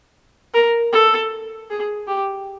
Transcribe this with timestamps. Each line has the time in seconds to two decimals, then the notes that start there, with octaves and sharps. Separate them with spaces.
0.54 A#4
0.93 A4
1.70 G#4
2.07 G4